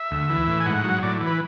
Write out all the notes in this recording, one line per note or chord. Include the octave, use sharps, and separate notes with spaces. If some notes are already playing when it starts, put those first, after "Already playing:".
Already playing: E5
D2
E3
A2
G#5
G#2 F#5
F#3
A2 D5
E3
B4